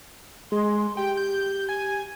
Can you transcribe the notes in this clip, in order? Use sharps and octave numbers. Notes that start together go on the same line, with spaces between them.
G#3 C6
G4 G5
G6
G#5